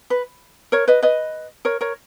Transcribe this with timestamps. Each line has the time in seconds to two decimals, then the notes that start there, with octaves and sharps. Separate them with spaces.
0.10 B4
0.72 A#4 C#5
0.88 B4 D#5
1.02 B4 D#5
1.65 A#4 C#5
1.81 A#4 C#5